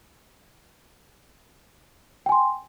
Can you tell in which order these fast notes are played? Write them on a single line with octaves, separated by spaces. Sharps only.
G5 G#5 C6